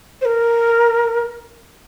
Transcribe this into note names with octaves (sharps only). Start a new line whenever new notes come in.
C5
A#4